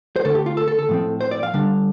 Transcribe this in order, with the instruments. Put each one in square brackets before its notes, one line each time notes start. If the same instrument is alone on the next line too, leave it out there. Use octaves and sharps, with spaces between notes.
[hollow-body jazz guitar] C5
D3 A3 D4 A4
G4
F4
A4
A4
A4
A2 F3 C4
C5
D5
F5
D3 G3 D4